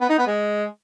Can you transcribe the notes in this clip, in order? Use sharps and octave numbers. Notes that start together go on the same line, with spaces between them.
B3
D#4
B3
G#3